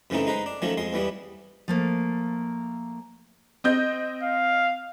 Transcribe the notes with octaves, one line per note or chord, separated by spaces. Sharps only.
F#2 C#3 E3 A3 C4 D#4
G#3 D#4 B4 C5
D4
D#3 F3 F#3 A3 C#4
F2 G#3 C6
E2 E3 G3 B3
F3 A3 A#3
C4 D#5 G6
F5